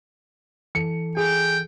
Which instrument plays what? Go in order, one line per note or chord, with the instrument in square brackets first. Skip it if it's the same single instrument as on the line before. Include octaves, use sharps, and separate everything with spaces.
[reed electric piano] E3 A4 [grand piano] C#7
[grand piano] G#4 [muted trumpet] G5